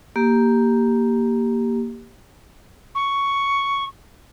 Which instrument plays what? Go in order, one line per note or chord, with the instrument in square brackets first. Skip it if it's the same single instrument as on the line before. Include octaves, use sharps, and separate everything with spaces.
[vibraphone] A#3 G4
[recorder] C#6